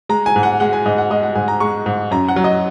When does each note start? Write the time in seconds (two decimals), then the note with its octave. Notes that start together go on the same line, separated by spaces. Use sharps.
0.09 G#3 A#5
0.26 G#5
0.36 G#2
0.43 F#5
0.60 G#3 F#5
0.73 G#5
0.86 G#2 D#5
0.98 F#5
1.10 G#3 D#5
1.23 F#5
1.35 G#2 G#5
1.48 A#5
1.60 G#3 C#6
1.86 G#2
2.11 F#2 A#5
2.28 F#5
2.36 F#3
2.44 D#5